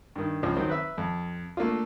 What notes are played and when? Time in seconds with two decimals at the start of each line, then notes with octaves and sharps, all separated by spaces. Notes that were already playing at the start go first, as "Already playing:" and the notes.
0.16 G2 D#3
0.43 C#2 F3
0.56 D#3 F#3 C4
0.70 B4 E5
0.98 F2
1.57 A3 A#3 D4 F4